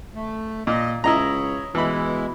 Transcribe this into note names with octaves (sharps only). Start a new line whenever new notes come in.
A3
A#2 D#5
C#2 E4 C#5 D#5 A#5
B2 E3 G#3 E4 B5